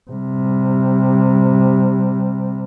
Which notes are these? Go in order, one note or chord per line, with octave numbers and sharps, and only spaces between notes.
C3 G3